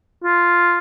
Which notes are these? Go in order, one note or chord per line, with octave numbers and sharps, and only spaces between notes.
F4